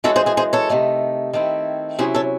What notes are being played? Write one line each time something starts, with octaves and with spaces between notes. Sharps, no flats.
F#2 E3 G#3 F#4 A4
G#4 C5
G#4 C5
G#4 C5
A4 C#5
C3 D#3 A3 D#4
D#3 A3 C4 E4
C3 F#3 C#4 E4 G#4 C5
A4 C#5